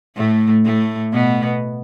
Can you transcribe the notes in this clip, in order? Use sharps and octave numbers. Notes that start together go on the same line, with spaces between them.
A2 A3
A2 A3
B2 B3